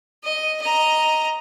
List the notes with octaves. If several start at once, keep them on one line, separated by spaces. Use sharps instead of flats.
D#5
D#5 A#5